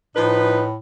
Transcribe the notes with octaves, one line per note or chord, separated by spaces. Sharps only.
A2 F3 D#4 B4